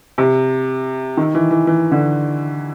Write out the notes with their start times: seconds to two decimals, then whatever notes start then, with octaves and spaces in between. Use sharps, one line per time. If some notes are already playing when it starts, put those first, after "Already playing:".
0.18 C3
1.17 D#3
1.35 E3
1.51 E3
1.67 E3
1.91 D3